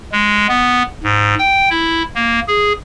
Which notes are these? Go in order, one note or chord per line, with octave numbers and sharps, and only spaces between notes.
G#3
B3
G#2
G5
E4
A#3
G#4